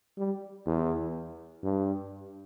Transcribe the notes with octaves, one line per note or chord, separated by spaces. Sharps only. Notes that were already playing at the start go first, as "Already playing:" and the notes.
G3
E2
G2